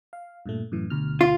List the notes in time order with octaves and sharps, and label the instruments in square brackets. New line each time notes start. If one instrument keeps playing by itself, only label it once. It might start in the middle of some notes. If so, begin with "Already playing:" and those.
[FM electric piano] F5
G2 A#2 A3
F#2 A2 E3
D2 B2 F6
[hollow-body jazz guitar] F4